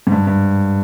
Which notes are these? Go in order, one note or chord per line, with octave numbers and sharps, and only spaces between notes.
G#2
G2
G2